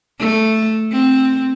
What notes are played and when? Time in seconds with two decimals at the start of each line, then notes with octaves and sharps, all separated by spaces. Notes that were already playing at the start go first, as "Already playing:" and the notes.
0.19 A3
0.91 C4